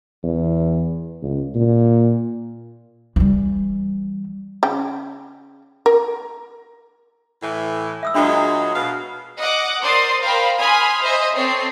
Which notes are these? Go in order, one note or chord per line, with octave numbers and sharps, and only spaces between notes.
E2
C#2
A#2
E3 G3
C#3 G5
A#4
A2 E3
E5 D#6 E6
A#2 F#3 G#3 D4 E5 B5
B2 F5
D#5 F#5 D6
A#4 C5 D5 C6 D#6
A#4 C5 F5 G5 B5
G#5 B5 C6 D#6 F6
C5 D#5 E5
C4 A4 C#5 C7